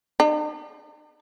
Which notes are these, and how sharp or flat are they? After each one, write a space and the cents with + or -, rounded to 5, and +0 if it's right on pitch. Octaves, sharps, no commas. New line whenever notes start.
D#4 -45